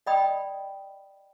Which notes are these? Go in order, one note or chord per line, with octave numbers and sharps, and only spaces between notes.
D5 D#5 G5 B5 D#6